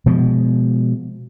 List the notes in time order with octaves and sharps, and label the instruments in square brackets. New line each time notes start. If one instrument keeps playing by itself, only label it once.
[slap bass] B2 F3 G#3